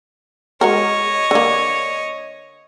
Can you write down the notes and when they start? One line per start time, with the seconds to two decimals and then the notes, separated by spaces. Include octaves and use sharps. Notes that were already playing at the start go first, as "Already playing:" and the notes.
0.61 G#3 F#4 A#4 C#5 D#5
1.31 D3 A#3